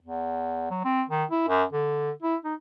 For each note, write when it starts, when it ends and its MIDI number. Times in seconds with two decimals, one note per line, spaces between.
0.02 0.66 40
0.71 0.81 54
0.84 1.02 60
1.09 1.24 51
1.31 1.45 64
1.48 1.64 42
1.73 2.11 50
2.22 2.36 64
2.44 2.54 63